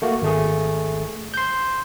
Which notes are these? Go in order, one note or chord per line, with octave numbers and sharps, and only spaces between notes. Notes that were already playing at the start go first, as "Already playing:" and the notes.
A3 A#3 F#4
G#1 A3 G#4
C6 G6